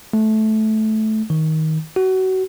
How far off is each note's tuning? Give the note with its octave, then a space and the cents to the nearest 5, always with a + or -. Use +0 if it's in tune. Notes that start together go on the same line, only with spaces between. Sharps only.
A3 -15
D#3 +20
F#4 +25